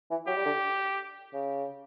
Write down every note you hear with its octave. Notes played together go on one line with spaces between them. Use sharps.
E3
F#3 G4
G3
D3
C#3